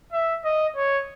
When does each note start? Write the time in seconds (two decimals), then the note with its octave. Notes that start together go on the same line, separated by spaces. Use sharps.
0.13 E5
0.44 D#5
0.77 C#5